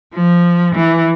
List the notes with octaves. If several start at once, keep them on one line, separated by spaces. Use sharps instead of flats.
F3
E3